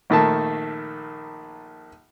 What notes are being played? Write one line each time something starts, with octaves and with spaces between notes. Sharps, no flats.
A#1 D#3 A3 A#3 A5